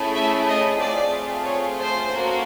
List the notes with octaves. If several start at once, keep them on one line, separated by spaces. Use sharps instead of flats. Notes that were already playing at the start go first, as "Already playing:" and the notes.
Already playing: A3 C#4 E4 G#4
E5
D#5
A3 C4 F4 G#4 D5
C#5
C5
A#3 C#4 F#4 A4